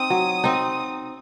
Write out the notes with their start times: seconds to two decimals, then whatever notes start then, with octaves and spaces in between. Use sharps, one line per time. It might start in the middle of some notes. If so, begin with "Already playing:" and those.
Already playing: C4 D#4 D#6
0.10 F#3
0.44 C4 D#4